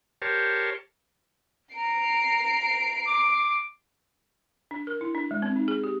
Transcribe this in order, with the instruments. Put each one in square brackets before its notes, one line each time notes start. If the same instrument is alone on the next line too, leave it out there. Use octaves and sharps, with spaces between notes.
[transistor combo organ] G4 A#4 C5 C#5 A5
[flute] A#5 [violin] C7 D7
[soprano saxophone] D6
[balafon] D4
A#4
E4
D4
G#3
C4
D#4
G#4
G4